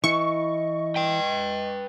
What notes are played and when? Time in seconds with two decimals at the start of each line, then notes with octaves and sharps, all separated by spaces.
0.04 E3 E4 D#5 C#6
0.96 B4 G5